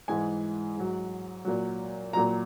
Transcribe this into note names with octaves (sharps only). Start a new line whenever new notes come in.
G#2 E3 G#3 G#5
G#2 F#3
A#2 F#3
A#2 F#3 A#5